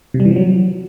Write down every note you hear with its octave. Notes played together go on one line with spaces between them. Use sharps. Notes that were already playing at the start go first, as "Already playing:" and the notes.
C3
G3
E3
F3
F#3